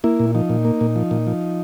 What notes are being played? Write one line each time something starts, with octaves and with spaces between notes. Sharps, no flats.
A#3 E4
A#2
F3 D#4
A#2
A#3
A#2
F3
A#2
F3